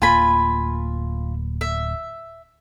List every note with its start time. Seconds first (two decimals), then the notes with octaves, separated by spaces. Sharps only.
0.02 D1 A#3 F4 G#5 B5
1.61 E5